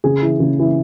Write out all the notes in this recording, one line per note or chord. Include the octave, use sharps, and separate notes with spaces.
C#3 G#4
E3
C#3
E3